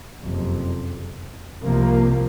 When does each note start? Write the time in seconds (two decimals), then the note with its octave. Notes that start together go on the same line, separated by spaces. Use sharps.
0.22 F#1 F2 C3
1.63 C2 C3 F3 A#3